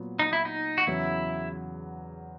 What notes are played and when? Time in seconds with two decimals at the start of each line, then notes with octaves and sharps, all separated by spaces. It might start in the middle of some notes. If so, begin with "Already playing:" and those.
Already playing: A#2 F#3 B3
0.19 D#4
0.33 E4
0.45 D#4
0.78 F#4
0.87 E2 C#3 F#3 E4